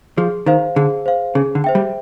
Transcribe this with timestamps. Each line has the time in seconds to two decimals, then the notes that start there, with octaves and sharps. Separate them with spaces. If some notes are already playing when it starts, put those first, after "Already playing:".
0.17 F3 G#4
0.46 D#3 C5 F5
0.76 D3 G#4
1.06 C5 F5
1.35 C#3 G#4
1.55 D3
1.64 C5 E5 G5
1.75 G3